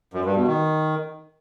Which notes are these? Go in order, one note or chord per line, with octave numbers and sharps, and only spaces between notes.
F#2
G2
B2
D#3